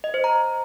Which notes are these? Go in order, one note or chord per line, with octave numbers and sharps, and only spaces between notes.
D#5
C5
A#5